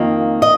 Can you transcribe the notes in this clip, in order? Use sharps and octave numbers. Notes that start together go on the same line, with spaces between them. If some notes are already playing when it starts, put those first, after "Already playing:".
Already playing: F2 D#3 A#3
D#5